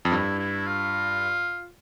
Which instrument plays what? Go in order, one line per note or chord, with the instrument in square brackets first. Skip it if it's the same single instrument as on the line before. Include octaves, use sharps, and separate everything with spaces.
[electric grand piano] F2
[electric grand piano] G2 [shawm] E4
[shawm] E4
F4